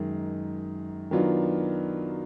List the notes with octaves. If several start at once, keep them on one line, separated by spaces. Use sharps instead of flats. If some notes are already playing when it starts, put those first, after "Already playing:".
Already playing: F#2 D#3 G#3
D#3 F#3 B3 D4 F4